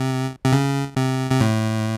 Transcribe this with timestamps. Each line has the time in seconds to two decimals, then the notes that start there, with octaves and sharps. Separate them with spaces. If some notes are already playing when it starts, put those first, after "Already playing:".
Already playing: C3
0.45 C3
0.52 C#3
0.96 C3
1.31 C3
1.40 A2